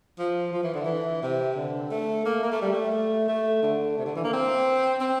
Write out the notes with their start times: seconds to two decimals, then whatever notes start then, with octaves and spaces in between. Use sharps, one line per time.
0.19 F3
0.53 F3
0.63 E3
0.74 D3
0.85 E3
1.23 C3
1.56 D3
1.91 A3
2.25 A#3
2.43 A#3
2.52 A3
2.62 G3
2.72 A3
3.28 A3
3.63 D3
3.98 C3
4.06 D3
4.15 E3
4.24 A#3
4.33 C4
5.01 C4